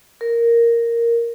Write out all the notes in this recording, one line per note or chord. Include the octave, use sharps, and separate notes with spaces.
A#4